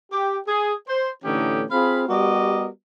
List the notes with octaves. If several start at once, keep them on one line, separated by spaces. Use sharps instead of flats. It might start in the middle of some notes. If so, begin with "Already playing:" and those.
G4
G#4
C5
A2 D3 E3 C#4 D#4 G4
C4 F4 G#4 F5 B5
G3 B3 F#4 G4 A#4 D#5